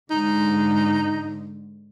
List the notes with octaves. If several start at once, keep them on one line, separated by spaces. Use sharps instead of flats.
G#2 D3 D#4